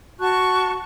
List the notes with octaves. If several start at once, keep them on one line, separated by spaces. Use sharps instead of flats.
F#4 A5 C#6 F#6